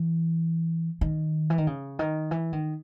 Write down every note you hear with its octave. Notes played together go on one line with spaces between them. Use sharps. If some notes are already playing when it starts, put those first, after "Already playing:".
Already playing: E3
D#3
E3
D#3
C#3
D#3
E3
D#3